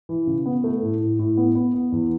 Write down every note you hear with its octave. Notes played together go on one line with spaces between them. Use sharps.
E3
C#3
B3
A3
A2
A2
A2
B3
B3
B3
E2